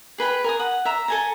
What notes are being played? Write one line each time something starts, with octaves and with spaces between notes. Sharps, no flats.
G#4 B4 G5 B5
A#4 G#5 D#6
F#5
E5 A#5
A4 G#5 A#5